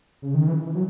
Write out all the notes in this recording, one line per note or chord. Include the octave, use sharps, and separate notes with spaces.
C#3
D#3
E3
E3
F#3